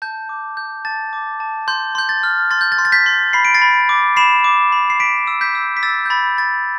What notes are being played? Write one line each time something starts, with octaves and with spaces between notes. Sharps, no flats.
A5 G6
D6
G6
A5 A6
D6
A5
C6 G6
C6 G6
A6
F6
C6 A6
G6
A6
C6
A6
G6 B6
C6
B5 C7
D7
A6 C7
B5
D6
B5 C7 E7
D6
B5
C7
B5 B6 D7
E6
G6 B6
E6
B6
E6 A6
G6
B5 A6
B5 A6